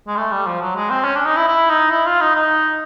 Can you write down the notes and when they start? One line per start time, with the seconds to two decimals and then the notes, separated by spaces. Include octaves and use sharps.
0.07 G#3
0.17 A3
0.31 G3
0.47 F3
0.61 F#3
0.76 G#3
0.90 C4
1.04 C#4
1.15 D4
1.26 D#4
1.37 E4
1.48 E4
1.70 D#4
1.91 E4
2.06 F4
2.21 D#4
2.36 D#4